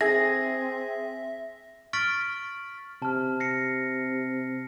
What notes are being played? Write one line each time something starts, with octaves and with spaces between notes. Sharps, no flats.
C4 G#4 E5 A#6
C#6 F6 A6 B6 D7 F#7
C3 A5 F6
A#6 C7 C#7